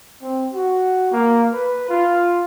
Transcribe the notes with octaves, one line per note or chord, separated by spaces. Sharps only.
C4
F#4
A#3
B4
F4